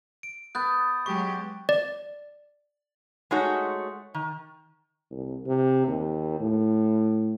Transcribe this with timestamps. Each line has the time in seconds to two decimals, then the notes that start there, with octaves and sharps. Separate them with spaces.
0.23 D7
0.55 B3 F#6 G6 A6
1.06 F#3 G#3 G4 C#6
1.69 D5
3.31 G#3 A3 D#4 F#4 C#5
4.14 D#3
5.11 C2
5.46 C3
5.88 D#2
6.40 A2